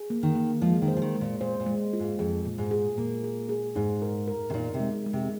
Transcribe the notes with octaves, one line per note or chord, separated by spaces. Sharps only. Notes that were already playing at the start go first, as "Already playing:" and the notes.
Already playing: G#4
A#3
D#3
A#3
F3 G#3
D#3
C5
F3
D#3
G#3
A#2
A#2 C5
A#2
G#3
F4
G#2
F2 G#4
A#2
G#2
G#4
A#2 A#3
G#4
G#4
G#2 D#4
A#4
A#4
C3
A#2 D#4
C3
G#3
G#3
C3